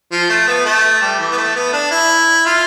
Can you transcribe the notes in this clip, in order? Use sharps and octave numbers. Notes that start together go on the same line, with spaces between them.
F3
A3
B3
A3
G3
E3
B3
A3
B3
D4
E4
F4